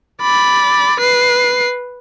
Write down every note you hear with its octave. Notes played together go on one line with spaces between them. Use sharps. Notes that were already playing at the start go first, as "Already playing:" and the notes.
D5 B5
B4 C7